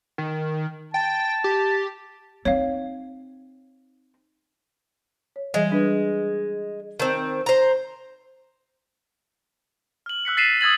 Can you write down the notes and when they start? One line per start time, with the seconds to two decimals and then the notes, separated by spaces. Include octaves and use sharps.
0.18 D#3
0.94 G5 A5
1.44 G4
2.45 C4 D#4 C#5 F5
5.36 C#5
5.54 E3 G3 G#3 D#5
5.70 G3 D4 B4
7.00 D#3 C4 A5
7.46 C5 A#5
10.06 F6 F#7
10.25 E6 F#6 B6 C#7
10.37 A6 B6 C7 D#7 E7
10.61 D#6 E6 G#6 A6 F#7